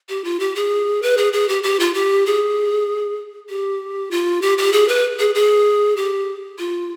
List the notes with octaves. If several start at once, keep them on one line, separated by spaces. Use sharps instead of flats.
G4
F4
G4
G#4
B4
G#4
G#4
G4
G4
F4
G4
G#4
G4
F4
G4
G4
G#4
B4
G#4
G#4
G4
F4